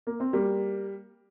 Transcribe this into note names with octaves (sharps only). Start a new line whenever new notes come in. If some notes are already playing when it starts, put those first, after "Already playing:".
A#3
C4
G3 A#3